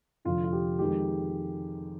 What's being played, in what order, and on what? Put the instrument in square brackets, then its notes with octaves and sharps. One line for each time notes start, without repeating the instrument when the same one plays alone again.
[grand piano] F1 F2 D3 F4
F4
G4
F2 D#3 G#3 G4